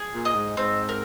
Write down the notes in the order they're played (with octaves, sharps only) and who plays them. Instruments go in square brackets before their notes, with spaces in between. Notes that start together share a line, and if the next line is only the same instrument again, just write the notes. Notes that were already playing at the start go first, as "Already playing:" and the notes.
Already playing: [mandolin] G#4
[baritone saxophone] A#2
[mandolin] D#5
[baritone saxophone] G#2
[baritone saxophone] G#2 [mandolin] C4
[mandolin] A#4